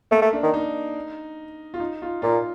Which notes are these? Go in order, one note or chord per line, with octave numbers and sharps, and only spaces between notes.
A3 A#3
A3
D4
D#3
D#4
F4
D#4
F4
A#2 F4